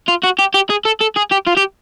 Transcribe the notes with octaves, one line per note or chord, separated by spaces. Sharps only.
F4
F#4
G4
G4
G#4
A4
A4
G#4
G4
F4
G4